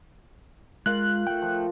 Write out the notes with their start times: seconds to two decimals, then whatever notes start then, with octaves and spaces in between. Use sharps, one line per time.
0.86 G#3 F4 A#4 F5 F#6
1.27 A3 G5
1.42 F3